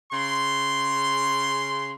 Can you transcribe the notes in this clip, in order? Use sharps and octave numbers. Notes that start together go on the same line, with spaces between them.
C#3 C6